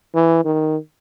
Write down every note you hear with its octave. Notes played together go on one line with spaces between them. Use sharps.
E3
D#3